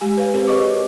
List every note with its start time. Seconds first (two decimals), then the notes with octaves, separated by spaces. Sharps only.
0.01 G#3 G4 G#5
0.17 B4 C#5 F5
0.34 C4 G4 A#4 C5
0.47 G4 G#4 C#5 D#5 C#6 D6
0.63 F#4